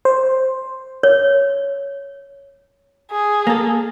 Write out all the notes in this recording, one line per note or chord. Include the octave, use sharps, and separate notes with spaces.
C5
C#5
G#4
A#3 A4